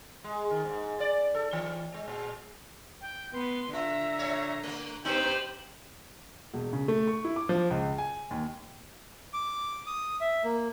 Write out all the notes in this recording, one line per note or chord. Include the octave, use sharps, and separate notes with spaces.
G#3
D#3
G#2
D5
A4
E3
G#3
A#2
G5
B3 B4 C6
D3 F4 E5 A#5
A#2 C#5
A3 A#3
B3 C4 D#4 G4 B4 C5 G6 F#7
E1
C#3
A3
C#6
E4
D6
F3
C#2
G#5
D#2
D6
D#6
E5
A#3